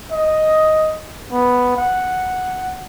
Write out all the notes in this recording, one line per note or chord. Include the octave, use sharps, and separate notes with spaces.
D#5
B3
F#5